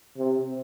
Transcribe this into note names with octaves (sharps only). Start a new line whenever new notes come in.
C3